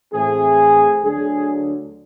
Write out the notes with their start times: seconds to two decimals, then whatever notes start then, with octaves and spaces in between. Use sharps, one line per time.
0.13 A2 E3 A3 C4 G#4
1.04 D2 D3 F#3 G#4